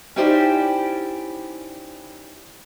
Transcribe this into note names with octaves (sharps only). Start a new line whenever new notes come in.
C#4 D#4 E4 G4 C5 D5